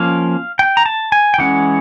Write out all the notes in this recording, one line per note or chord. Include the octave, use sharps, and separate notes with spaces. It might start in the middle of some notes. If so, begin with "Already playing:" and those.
Already playing: F3 A#3 C#4 F5
G5
A#5
A5
G#5
G5
E3 G#3 C#4 F#5